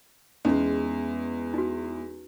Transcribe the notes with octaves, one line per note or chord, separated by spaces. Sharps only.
E2 G#3 C#4 D#4
D#4 F#4